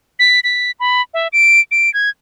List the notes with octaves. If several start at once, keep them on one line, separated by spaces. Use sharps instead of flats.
B6
B6
B5
E5
D7
D7
G#6